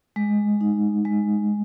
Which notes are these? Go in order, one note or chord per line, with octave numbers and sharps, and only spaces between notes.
G#3
D#4
G#3